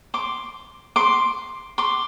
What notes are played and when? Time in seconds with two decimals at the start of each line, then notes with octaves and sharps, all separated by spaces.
0.14 C6 D6
0.96 C6 D6
1.78 C6 D6